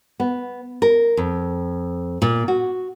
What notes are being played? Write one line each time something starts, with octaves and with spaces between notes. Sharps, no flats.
B3
A#4
F2
A#2
F#4